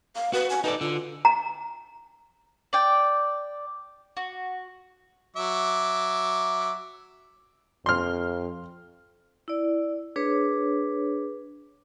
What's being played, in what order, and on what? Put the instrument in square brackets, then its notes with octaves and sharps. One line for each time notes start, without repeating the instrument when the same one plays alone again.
[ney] F5
[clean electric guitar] F#4 [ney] B4
[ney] G#5
[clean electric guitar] D#4 A4 D5 [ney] B4
[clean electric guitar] D3 [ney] F4
[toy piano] A#5
[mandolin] D5 G5
F#4
[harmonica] F#3 E5 D6
[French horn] F2 [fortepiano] C6 F6
[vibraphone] E4 D5
D4 G#4 B4 C#5